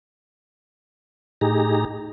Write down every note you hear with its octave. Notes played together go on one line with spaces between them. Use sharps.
A2 D#4 G4 G#4 A#5